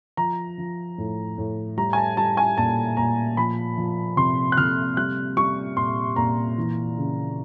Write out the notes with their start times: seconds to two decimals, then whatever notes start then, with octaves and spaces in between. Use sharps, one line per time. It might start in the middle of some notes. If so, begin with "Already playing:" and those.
0.17 F3 A#5
0.58 F3
0.98 A2
1.38 A2
1.77 G3 A#5
1.93 G#5
1.97 A5
2.17 G3 A5
2.37 G#5
2.57 A#2 A5
2.97 A#2 A#5
3.37 F3 B5
3.77 F3
4.17 C3 C6
4.52 F#6
4.57 C3 F6
4.97 G3 F#6
5.37 G3 C#6
5.77 A#2 C6
6.16 A#2 A#5
6.57 E3
6.97 C#3